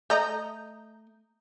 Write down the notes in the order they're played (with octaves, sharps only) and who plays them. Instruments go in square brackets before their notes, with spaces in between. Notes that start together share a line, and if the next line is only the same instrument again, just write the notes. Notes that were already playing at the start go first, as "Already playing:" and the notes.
[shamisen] A3 D#5 [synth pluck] A#5 D#6 G6